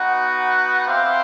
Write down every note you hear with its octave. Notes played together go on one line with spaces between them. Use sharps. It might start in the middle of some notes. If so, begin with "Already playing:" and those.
Already playing: B3 D#4 F#4
C4 E4 G4 C5 F5